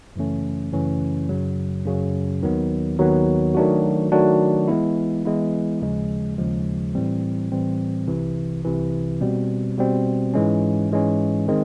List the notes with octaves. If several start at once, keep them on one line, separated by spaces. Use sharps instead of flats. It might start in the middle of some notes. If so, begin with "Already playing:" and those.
F#2 C#3 E3 A3 C#4
F#2 C#3 E3 A3 C#4
F#2 C#3 F#3
F#2 C#3 F#3
D#2 D#3 F#3 B3
D#2 D#3 F#3 B3
D#3 F#3 A3 D4 F#4
D#3 F#3 A3 D4 F#4
E3 G#3 B3 E4
E3 G#3 B3 E4
D#2 C#3 F3 G#3
D#2 C#3 F3 G#3
A2 E3 G3 C4
A2 E3 G3 C4
C2 C3 E3
C2 C3 E3
B2 G3 C4
B2 G3 C4
G#2 E3 G#3 C#4
G#2 E3 G#3 C#4
D#3 G#3 C4